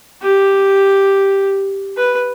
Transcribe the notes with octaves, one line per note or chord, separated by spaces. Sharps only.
G4
B4